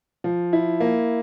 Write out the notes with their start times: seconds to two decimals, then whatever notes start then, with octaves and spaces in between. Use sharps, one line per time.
0.24 F3
0.53 E4
0.80 A#3